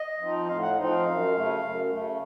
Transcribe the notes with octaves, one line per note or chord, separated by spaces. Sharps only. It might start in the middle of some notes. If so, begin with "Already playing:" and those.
Already playing: D#5
F3 C4 D#4
A2 F5
F#5
F3 C4 D#4
F5
F#2
C#3 A3
F#2
C#3 A3